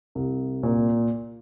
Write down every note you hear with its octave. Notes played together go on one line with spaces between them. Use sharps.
C2
A#2